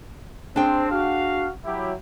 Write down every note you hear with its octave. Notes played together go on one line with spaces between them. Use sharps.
C4 D4 G#4 G5
F#4 F5
F#3 E4 G4